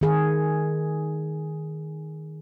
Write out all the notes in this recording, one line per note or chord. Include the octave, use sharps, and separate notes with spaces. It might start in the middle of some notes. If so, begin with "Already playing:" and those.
D#3 G#4